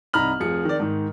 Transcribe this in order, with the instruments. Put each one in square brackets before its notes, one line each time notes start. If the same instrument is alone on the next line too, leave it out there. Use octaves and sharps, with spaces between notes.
[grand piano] C2 D#4 A#5 B5 F6 F#7
F1 F3 G#4 C#7
D#3 D5
G#2 D#3